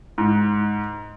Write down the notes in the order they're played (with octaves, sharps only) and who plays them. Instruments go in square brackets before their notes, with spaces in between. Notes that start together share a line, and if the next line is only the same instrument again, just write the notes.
[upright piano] G#2